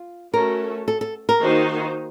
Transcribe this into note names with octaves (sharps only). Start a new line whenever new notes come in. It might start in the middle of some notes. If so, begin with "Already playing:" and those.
Already playing: F4
A3 C#4 F#4 A4 A#4
A4
A4
A#4
D#3 A#3 D#4 F#4 C5